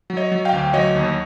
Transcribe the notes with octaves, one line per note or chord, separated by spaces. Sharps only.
F#3
C#5 D#5
F#3
F5 G5
D2
F#3 C#5 D#5
D#2